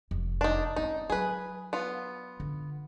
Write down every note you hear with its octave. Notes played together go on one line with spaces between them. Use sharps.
F1
D4 D#4
C4 C#4 D#4
F#3 G#4 B4
B3 F4
D3